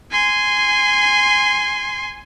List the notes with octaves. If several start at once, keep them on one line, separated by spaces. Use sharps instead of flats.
G#5 C6